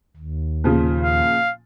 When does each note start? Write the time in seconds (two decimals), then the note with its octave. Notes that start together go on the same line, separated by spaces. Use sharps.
0.17 D#2
0.64 A#2 C#3 F3
1.03 F5